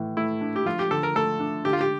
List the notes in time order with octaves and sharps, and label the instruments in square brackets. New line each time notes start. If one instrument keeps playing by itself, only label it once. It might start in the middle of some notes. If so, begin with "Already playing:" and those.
Already playing: [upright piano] A2 E3
[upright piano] A3 [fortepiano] E4
[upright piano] D4
[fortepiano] G4
[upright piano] F3 [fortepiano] F4
[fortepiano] G4
[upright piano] D3 [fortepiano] A4
[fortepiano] A#4
[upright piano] A3 [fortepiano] A4
[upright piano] D4
[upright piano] D3 [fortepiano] G4
[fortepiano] F4
G4